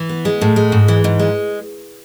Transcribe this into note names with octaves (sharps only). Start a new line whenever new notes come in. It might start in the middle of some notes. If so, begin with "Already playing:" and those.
Already playing: E3
B3
G#3
A2
G#3
G#2
E3
G#2
G#3